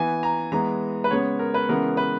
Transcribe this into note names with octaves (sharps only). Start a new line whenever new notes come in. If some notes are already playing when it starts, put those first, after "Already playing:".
Already playing: E3 B3 G#5
A#5
E3 G#3 B3 A#5
B4
C#3 G#3 B3 C#5
A#4
B4
C#3 E3 G#3 B3 A#4
B4